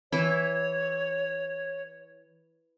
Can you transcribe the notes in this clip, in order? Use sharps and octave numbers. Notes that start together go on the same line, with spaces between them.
E3 E4 C#5